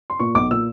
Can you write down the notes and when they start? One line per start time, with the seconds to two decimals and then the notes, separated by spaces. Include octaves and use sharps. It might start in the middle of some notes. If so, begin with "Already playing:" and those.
0.10 C6
0.19 A#2 C#6
0.35 B1 D6
0.51 A#2 E6